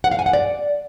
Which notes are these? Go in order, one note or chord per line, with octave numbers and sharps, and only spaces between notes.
F#5
F5
G#5
F#5
D5